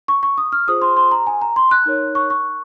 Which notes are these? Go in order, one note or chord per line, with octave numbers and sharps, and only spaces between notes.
C#6
C#6
D#6
F6
F4 G#4 C5 D#6
C6
C6
A#5
G#5
A#5
C6
F#6
D#4 A#4 C#5
C#6
C#6